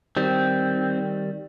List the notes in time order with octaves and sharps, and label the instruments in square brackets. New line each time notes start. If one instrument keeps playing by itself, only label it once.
[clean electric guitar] D#3 G3 [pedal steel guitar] C4